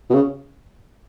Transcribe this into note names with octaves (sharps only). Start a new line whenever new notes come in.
B2
C#3